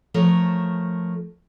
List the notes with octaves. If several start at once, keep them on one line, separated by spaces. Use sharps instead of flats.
F3 A3 A#4 C#5